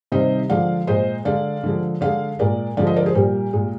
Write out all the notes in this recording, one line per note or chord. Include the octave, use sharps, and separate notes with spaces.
C3 D#3 G3 C5 D#5
D3 F3 G#3 D5 F5
A#2 G#3 C5 D#5
D3 G#3 D5 F5
D3 F3 G#3
D3 G#3 D5 F5
A#2 G#3 A#4 D5
D3 F3 G#3 D5 F5
C5 D#5
A#4 D5
G#4 C5
A#2 G3 G4 A#4
A#2 G#3